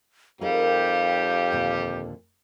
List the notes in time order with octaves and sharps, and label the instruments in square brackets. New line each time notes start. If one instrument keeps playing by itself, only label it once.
[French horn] F2 [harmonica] G3 G4 [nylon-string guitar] D#4 G#4 A#4 [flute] F5
[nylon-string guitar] D#2 A#2 D3